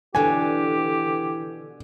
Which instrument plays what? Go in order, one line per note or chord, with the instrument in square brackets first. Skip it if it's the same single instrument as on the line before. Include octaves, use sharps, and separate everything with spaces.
[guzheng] B2 D3 [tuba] E3 [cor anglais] G4 [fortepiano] G#5